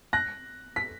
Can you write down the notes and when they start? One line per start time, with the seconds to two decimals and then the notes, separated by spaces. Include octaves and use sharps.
0.13 F#6 A#6
0.76 B6